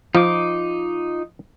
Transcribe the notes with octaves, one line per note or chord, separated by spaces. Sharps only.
F3 D#4 F4 D6